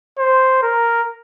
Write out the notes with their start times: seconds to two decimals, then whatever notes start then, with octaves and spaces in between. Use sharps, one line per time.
0.19 C5
0.63 A#4